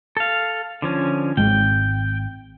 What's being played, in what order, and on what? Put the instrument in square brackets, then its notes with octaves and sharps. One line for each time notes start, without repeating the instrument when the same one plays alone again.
[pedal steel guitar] A4 F5
D3 F3 C#4
[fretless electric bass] G#1 G#3 [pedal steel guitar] G5